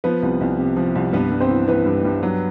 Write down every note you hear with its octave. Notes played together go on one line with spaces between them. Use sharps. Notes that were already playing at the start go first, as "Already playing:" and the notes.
F3 B3 B4
C2
C2
C3
F3
C2
G2 B3 B4
G2
C4 C5
E3
E3 B3 B4
G2
G2
F#3